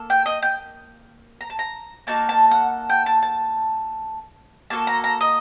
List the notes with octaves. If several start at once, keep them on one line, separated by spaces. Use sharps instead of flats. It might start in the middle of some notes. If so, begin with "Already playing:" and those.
Already playing: A#3 A4
G5
D#5
G5
A#5
A5
A#5
A#3 D#4 F#4 A4 A5
A5
F#5
G5
A5
A5
A#3 F#4 A4 A5
A#5
A#5
D#5